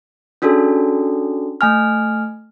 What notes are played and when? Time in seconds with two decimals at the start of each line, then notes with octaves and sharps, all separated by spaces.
0.42 C#4 D4 F#4 G#4 A4
1.61 A3 G#5 F6